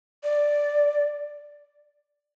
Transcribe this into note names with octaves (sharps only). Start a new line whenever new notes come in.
D5